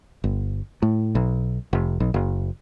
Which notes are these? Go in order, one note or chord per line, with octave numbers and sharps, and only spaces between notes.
G1
A2
B1
F1
B1
F#1